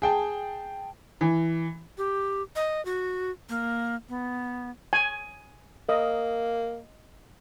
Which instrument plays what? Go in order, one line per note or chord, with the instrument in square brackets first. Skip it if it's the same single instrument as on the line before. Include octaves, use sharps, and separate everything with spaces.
[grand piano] G#4 G5 A5
[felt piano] E3
[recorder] G4
D#5
F#4
A#3
B3
[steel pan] G#5
[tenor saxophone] A#3 [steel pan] D#5